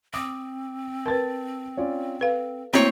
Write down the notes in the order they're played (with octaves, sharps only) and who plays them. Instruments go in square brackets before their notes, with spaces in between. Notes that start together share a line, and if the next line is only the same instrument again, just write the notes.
[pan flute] C4 [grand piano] D6 D#6
[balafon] A#4 B4 [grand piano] A5 A6
[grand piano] C#4 F4 D5
[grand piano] A4 [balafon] B4 F5
[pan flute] A3 [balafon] A#3 E4 F#4 [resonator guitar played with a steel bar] C4 C#5 [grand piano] A#5